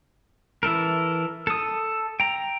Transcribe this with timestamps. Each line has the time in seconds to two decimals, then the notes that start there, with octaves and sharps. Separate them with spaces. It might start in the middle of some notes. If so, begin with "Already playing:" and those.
0.63 E3 E4 A4 A#4
1.47 A4 D#6
2.20 G5 A#5